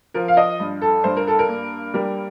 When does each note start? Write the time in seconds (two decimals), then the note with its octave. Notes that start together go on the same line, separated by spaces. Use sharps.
0.14 F3 A#4
0.28 F5
0.37 D#5
0.60 G2
0.81 A4
1.04 G2 C5
1.17 A#4
1.27 A4
1.39 A#4
1.49 A#3
1.94 G3 A#4